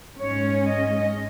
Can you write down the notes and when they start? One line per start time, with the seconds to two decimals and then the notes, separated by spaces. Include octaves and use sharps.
0.19 G#2 G#3 C#4 C#5
0.69 D#5